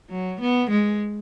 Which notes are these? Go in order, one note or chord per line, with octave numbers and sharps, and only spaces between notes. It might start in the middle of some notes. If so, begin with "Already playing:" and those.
F#3
B3
G#3